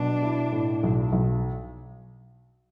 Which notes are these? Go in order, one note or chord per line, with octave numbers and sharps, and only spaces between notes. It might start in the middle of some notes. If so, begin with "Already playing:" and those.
Already playing: B2 F#3 D4
E4
A2
B1
B1